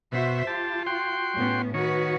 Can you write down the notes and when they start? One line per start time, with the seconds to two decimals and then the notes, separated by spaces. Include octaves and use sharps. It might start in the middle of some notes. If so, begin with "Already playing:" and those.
0.12 B2 F#4 C5 E5
0.47 F4 G4 A5
0.86 F#4 G5 C6
1.35 A2 B3 C#4
1.74 D#3 F#4 B4 C#5